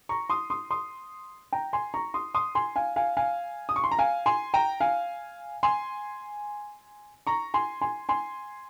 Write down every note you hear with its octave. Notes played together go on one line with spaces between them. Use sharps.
A#5 C#6
C6 D#6
C6 D#6
C6 D#6
G5 A#5
G#5 C6
A#5 C#6
C6 D#6
C6 D#6
G#5 C6
F5 G#5
F5 G#5
F5 G#5
D#6
C#6
C6
A#5
F5 G#5
G#5 C6
G5 A#5
F5 G#5
G#5 C6
A#5 C#6
G#5 C6
G#5 C6
G#5 C6